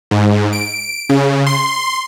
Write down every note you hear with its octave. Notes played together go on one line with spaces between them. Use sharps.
G#2
D7
C#3
C6